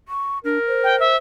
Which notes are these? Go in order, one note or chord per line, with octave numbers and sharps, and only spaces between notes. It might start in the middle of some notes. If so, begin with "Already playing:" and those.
C#6
D4 A#4
C5
G5
E5